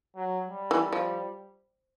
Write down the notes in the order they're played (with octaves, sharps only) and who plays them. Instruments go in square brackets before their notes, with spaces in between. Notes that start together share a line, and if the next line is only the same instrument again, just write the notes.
[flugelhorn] F#3
G3
[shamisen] E3
F3